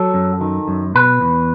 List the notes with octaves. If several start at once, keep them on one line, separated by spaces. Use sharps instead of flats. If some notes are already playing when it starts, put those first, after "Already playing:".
Already playing: F#3 A4
F#2
D#3
F#2
B2 B4
E2